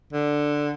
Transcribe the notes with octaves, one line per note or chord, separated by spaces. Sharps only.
D3